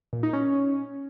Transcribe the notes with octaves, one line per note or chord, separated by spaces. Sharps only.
A#2
D#4
C#4